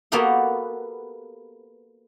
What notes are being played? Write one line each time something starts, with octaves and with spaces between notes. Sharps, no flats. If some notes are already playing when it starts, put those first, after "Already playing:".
A#3 B3 F#4 G4 A4 F5